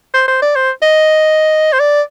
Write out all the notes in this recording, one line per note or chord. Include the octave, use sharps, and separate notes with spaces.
C5
C5
D5
C5
D#5
C5
D5